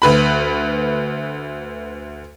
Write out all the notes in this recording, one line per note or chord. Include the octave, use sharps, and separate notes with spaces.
D2 B4 B5